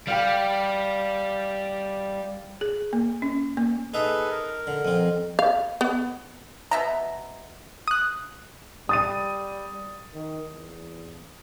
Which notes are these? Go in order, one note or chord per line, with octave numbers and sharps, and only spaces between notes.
G3 F5 G5 B5
G#4
A#3
C#4
A#3
D#4 G#4 A4 B4 E5
A#4
D3
F2 C4
F5
B3
B2 E5 A#5
D#6 F#6
G3 D#6 A6 D#7
D#3
E2